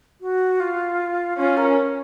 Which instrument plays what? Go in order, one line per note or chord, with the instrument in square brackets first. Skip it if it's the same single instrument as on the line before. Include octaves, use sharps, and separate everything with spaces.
[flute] F#4
F4
[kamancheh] C#4 [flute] F4
[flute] A#4